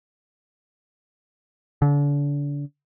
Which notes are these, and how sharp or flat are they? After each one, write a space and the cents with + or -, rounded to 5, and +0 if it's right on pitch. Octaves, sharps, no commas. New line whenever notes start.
D3 -35